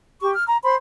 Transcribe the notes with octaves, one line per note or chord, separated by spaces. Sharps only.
G4 C#6
F6
A#5
C5 B5 C6